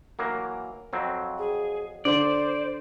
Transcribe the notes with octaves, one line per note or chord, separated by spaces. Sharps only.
E3 F#3 A#3 A#4
F2 F#3 C4
G#4
D3 C5 D5